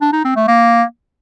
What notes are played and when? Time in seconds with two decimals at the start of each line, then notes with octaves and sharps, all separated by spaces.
0.01 D4
0.13 D#4
0.24 C4
0.36 A3
0.48 A#3